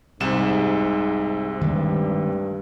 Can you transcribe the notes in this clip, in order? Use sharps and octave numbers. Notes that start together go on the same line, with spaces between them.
C2 G#2 C3 E7
G2 D#3 G#3 A3